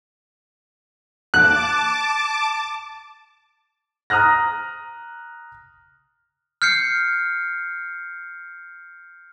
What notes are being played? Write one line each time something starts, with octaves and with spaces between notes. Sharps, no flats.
A5 D6 F#6
A#5 D#6 F6 F#6 A#6
F6 G6 C7 C#7